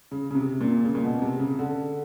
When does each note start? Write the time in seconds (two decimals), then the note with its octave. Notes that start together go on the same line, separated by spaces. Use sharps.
0.11 C#3
0.31 C#3
0.35 C3
0.61 A#2
0.84 C#3
0.95 A#2
1.03 B2
1.22 C3
1.40 C#3
1.59 D3